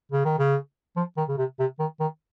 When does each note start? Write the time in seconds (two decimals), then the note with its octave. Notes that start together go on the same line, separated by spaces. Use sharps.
0.12 C#3
0.25 D#3
0.38 C#3
0.96 F3
1.17 D#3
1.28 C#3
1.38 C3
1.59 C3
1.79 D#3
2.00 D#3